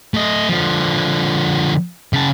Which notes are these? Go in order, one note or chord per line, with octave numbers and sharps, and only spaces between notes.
A3 D#5
D3 F3
C#3 A5